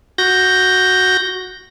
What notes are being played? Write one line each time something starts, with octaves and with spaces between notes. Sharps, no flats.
F#4 G6 A#6